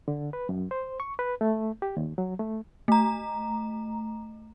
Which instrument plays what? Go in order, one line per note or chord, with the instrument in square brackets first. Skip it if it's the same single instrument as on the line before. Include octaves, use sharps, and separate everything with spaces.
[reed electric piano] D3
B4
F#2
C5
C#6
B4
A3
G4
D#2
F#3
A3
[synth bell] A3 A#5